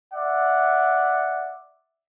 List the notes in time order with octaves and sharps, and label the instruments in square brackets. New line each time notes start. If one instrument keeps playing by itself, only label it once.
[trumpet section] D5 E5 F#5